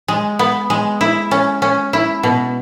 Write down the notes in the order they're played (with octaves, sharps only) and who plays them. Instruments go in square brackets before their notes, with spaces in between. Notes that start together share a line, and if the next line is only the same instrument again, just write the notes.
[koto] G#3
B3
G#3
E4
C#4
C#4
E4
B2